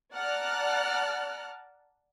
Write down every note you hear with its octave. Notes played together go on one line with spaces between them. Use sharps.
D5 F#5 A5 A#5 F6 F#6